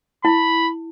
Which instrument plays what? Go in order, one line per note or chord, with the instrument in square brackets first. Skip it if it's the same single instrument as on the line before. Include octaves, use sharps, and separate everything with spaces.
[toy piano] E4 [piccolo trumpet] B5